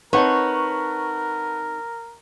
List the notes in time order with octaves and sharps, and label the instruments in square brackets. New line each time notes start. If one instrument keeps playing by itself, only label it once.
[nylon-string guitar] C4 D#4 [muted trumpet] A#4 [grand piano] B4 F#5 A5 [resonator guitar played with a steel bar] C#5